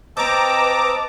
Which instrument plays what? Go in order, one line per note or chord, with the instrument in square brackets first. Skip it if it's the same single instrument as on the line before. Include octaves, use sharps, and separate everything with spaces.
[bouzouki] C4 C5 [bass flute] B4 [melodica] D#5 A5 E6 [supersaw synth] A#5 D6